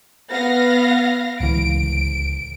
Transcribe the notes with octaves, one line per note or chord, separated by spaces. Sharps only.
B3 F5 A#6
D1 C#2 E3 D7